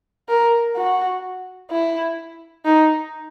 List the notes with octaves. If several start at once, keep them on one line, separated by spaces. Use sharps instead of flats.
A#4
F#4
E4
D#4